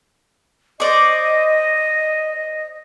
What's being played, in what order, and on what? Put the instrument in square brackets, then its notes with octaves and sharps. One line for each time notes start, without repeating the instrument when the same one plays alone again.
[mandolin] C5 D5 C#6 [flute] D#5